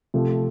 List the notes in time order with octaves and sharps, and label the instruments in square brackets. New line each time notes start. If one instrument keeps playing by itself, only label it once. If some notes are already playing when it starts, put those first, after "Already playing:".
[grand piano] C3 F3 A3